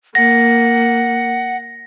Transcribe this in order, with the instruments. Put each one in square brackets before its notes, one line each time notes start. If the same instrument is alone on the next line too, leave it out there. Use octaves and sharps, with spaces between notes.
[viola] A#3 [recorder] F#5 [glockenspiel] A#6